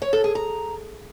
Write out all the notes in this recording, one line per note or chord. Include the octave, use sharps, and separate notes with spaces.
C#5
A4
G#4
A#5